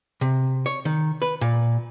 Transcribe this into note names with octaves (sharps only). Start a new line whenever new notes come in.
C3
C#5
D#3
B4
A#2